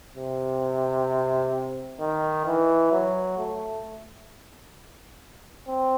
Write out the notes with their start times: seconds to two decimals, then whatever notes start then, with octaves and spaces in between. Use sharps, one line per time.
0.16 C3
2.00 D#3
2.46 E3
2.92 F#3
3.38 A3
5.68 C4